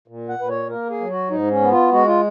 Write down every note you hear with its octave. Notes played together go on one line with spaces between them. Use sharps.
A#2
F#5
A#2 B4
C#5
A#3 A#4
G#4
F#3
F#4
G#2 D#4
C#4
B3
F4
G#3 F#4
F4